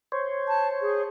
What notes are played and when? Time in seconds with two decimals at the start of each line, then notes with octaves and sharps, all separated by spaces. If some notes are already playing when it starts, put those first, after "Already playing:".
0.12 C5 C#5
0.48 A5
0.82 G#4